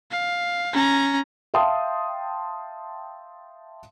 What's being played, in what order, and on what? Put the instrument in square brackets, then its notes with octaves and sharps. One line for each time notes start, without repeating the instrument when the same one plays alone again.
[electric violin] F5
C#4 A#5
[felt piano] E5 F5 G5 A5 C6 D#6